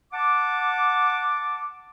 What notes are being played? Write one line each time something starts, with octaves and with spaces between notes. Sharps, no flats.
F#5 A5 D6